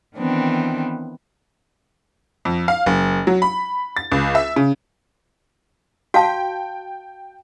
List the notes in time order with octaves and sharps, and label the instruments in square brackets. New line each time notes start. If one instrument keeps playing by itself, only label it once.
[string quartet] D#3 E3 B3 C4 D4
[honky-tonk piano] F2
F5
F#1
F#3
B5
A6
C#2
E5
C#3
[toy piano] F#4 F5 A5 [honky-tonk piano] G5